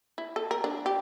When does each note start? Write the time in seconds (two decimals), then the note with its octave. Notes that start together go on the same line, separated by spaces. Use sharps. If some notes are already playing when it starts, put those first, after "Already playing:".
0.18 E4
0.36 A4
0.51 A#4
0.64 D4
0.86 G4